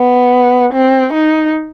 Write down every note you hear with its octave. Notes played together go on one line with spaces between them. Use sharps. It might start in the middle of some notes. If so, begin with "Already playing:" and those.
Already playing: B3
C4
D#4